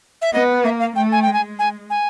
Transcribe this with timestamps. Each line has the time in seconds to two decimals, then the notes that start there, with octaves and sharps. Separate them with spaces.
0.22 E5
0.33 B3 D#5
0.64 A#3 E5
0.80 F5
0.96 A3 G5
1.12 G#5
1.22 G#3 G5
1.33 G#5
1.59 G#5
1.90 G#5